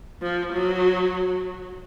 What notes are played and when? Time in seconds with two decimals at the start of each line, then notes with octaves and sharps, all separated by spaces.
0.22 F3
0.53 F#3